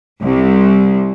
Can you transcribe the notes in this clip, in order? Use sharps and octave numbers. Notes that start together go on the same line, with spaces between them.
C2